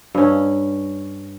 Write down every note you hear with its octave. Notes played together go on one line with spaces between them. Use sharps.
G2 C#4